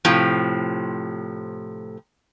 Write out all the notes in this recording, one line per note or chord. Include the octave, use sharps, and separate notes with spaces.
A2 C3 F3